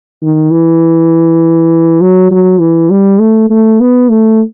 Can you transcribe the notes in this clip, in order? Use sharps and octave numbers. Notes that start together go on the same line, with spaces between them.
D#3
E3
F#3
F#3
E3
G3
A3
A3
B3
A3